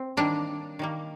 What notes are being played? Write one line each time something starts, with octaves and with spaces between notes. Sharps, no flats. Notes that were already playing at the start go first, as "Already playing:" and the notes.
Already playing: C4
D#3 G3 A#3 D4
D#3 G3 A#3